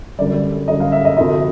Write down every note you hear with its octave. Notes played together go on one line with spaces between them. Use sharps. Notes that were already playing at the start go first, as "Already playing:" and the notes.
F#2 D3 G3 D5
F#2 D3 G3 D#5
F5
E5
D#5
D2 C3 F3 D#5